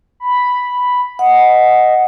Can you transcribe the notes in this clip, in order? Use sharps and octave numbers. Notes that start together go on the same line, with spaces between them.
B5
D#5 F#5